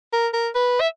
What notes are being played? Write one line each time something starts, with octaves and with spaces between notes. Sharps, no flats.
A#4
A#4
B4
E5